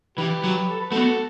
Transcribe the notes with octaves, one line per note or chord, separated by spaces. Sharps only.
E3 G4 B4
F#3
A4
B4
A3 B3 F#4 A4